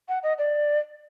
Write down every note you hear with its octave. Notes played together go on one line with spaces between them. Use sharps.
F#5
D#5
D5